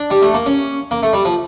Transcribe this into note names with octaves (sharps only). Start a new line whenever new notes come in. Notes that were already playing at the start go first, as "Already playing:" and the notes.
Already playing: D4
G3
A3
A#3
C#4
A#3
A3
G3
F3